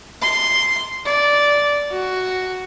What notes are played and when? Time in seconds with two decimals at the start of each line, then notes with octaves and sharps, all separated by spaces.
0.22 C6
1.06 D5
1.91 F#4